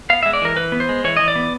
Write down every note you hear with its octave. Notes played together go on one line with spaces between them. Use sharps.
B3 F5
G#3 E5
D5
E3 A#4
E3 B4
B3
C5
G#3
E3 C#5
E3 D#5
D5
B3